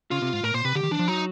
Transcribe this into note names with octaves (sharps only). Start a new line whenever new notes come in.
C#3 F4
C3
G#2
A2 A#4
A#2 C5
C3 B4
D3 G4
D#3
E3 D4
F3
F#3 D#4